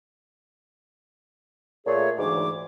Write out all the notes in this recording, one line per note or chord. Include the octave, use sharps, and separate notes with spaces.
A#2 A3 G#4 C#5
D2 G#2 E3 D6